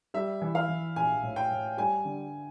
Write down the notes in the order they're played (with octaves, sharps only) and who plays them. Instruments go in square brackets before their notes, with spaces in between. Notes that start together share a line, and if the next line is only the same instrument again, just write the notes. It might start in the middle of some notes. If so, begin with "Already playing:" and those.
[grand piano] G3 [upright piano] E5
[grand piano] E3
[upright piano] F5
[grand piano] E3
[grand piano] A#1 [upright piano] G#5
[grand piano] A2
[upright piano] G5
[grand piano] A2
[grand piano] G3 [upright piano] G#5
[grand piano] D3